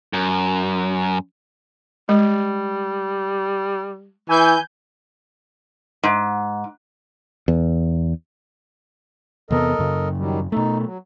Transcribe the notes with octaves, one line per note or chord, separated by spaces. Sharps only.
F#2
G3 G#3
E3 G#5 G6
G#2
E2
E2 C3 B3 A4 A#4 D#5
F#2 C#3
D#3 F#3 G3
B2 A3 D#4
F#3